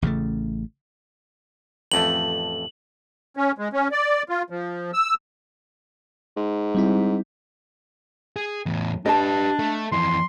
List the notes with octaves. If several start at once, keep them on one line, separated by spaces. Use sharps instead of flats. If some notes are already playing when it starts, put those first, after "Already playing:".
A1 C#3 F#3 A3
A1 F2 A3 F#7
C#4
G#3
C#4
D5
F4
F3
E6
G#2
G3 C4 E4
G#4
E2 A2
D4 G4 B4 D#5 A5
A3
F2 E3 C6